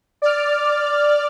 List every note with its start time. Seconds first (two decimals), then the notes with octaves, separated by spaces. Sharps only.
0.22 D5 F6